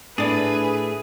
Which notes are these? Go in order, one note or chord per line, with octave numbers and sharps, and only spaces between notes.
A2 D4 G#4 B4 D5